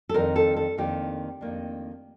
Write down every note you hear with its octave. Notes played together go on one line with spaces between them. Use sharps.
A4
F2 D#3 G3 D4 A#4
A4
A4
F2 D#3 A#3 D4 G4
F2 D#3 A#3 D4